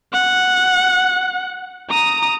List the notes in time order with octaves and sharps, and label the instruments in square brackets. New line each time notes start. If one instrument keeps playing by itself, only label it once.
[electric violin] F#5
A#5 D#6